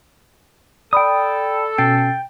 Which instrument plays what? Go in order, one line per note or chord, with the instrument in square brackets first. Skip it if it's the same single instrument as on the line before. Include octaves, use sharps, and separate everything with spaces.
[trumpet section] A4 [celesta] D5 B5 [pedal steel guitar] G5 D#6
[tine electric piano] B2 C#4 C7 [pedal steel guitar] G5 [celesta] A6